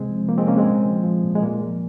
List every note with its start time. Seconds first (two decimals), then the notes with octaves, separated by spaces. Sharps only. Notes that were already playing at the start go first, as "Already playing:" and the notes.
Already playing: C3 G#3 C4
0.10 F3
0.28 F3 A#3
0.38 G#3 C4
0.47 C3 A#3 C#4
0.58 G#3 C4
0.66 A#2
0.85 F3
1.04 F3
1.24 A#2
1.35 G#3
1.42 A#2 A#3
1.61 F3